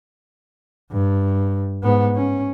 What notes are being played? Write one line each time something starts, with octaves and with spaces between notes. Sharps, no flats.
G2
G#2 B3
C#4